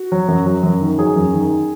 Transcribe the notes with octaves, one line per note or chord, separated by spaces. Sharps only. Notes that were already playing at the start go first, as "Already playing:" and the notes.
Already playing: F#4
F#3
F#2
F#3
F#2
D#3
F#3 G#4
F#2
D#3